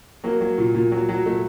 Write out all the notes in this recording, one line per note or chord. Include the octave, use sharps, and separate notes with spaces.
F#3 A#3
F#3
A#2
A#2
F#3
F#3
A#2 A3